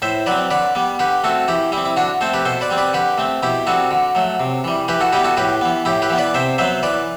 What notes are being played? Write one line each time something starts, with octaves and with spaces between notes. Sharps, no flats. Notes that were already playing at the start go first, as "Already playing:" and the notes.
A2 C5 E5
F#3 C4 B4 D5
D3 B4 D5
G3 B3
D3 G4 B4
A3 C4 F#4 A4
E3 E4 G4
G3 C4 E4
E4
D3 D4 F#4
A3 C4 A4 C5
G4 B4
B2 A4 C5
B4 D5
G3 C4
B4 D5
D3 G4 B4
A3 C4
B2 E4 G4
G3 C4 F#4 A4
D3
F#3 A3
C3
E3 G3
E3 G4 B4
F#4 A4
G3 B3 E4 G4
F#4 A4
A2 G4 B4
E3 B3
A2 E4 G4
G4 B4
E3 B3
B4 D5
C3 C5 E5
F#3 B3 C5 E5
E3 B4 D5